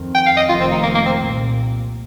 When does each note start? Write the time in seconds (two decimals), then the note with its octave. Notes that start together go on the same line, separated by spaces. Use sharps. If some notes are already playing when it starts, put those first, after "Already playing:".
Already playing: F2 D#3 C4
0.15 G5
0.26 F5
0.37 D#5
0.48 F1 F2 D#3 F4
0.61 C4
0.71 D#4
0.83 A#3
0.95 A#3
1.06 C4
1.17 C2 A#2 A#3